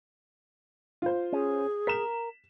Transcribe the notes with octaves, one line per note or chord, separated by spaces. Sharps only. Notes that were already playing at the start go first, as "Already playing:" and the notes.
F4 C5
C#4 G#4
A#4 B6 E7